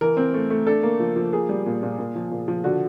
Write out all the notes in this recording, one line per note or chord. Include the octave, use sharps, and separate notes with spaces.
E3 A#4
C4
A3
A3
D4 A4
A#3
F3
F3
A#3 G#4
G3
A#2
A#2
A#2
F3
A#2
F3
D3 F#4